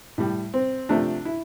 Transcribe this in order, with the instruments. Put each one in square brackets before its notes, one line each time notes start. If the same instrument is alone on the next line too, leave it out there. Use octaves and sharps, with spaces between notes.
[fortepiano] A2 G3
C4
C3 F3 A3 D4
E4